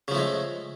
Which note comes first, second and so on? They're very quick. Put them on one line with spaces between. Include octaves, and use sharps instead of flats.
C#3 F3 A3 G#3